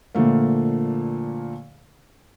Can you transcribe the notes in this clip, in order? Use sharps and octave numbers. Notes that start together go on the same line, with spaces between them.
A#2 D3 F3 A3 A#3